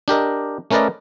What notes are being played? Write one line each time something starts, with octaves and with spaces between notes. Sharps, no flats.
D4 G4 A#4 D#5
A3 C#4 A#4 B4 D5 D#5